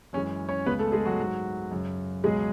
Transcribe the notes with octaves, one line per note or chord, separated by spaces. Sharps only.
F#2 E3 G#3 C#4 C#5
C#4 C#5
C#2 C#3 G#3 B3 B4
A3 A4
G#3 G#4
F#3 F#4
G#2 F#3
F#2 C#3 F#3
C#2 B2 F#3 G#3 G#4